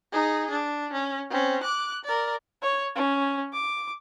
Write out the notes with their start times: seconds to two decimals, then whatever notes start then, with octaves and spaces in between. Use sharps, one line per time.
0.12 D#4 G#4
0.50 D4
0.92 C#4
1.30 C4 C#4
1.63 D6 F#6
2.04 A#4 D5
2.62 C#5
2.96 C#4
3.53 D6